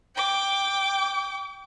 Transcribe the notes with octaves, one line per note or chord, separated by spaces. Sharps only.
G5 D6